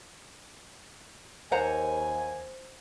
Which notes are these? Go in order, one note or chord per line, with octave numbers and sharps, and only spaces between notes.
D#2 C5 F#5 G#5 A#5